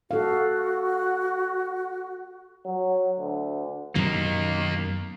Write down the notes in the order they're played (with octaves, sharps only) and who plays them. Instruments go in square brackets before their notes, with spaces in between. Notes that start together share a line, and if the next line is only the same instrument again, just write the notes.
[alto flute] F#4 [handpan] A4 F5
[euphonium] F#3
D2
[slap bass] F#2 B2 D#3 [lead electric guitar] A#3 D#4